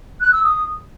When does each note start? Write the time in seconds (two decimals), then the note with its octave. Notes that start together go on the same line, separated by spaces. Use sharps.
0.20 F#6
0.32 E6
0.43 D#6